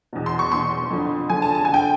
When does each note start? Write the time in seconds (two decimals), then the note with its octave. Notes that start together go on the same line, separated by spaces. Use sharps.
0.13 E2 B2
0.26 C6
0.39 C#6
0.52 E2 B2 C6
0.91 F2 D3
1.29 F2 D3 G#5
1.42 A5
1.55 A5
1.65 D3 G#5
1.74 G5